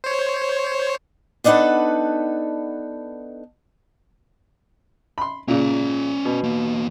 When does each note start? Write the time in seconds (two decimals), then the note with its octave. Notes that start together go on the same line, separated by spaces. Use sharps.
0.04 C5 C#5
1.44 B3 D4 D#4 A4 B4 F#5
5.18 B5 C6
5.48 A#2 C#3 C#4 D5
6.25 B2
6.43 E2 A#3